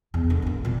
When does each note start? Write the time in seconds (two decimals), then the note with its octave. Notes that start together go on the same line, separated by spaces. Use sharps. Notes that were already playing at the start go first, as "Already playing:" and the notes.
0.14 E2
0.30 D3
0.42 G#2 A#3
0.65 A#2 E3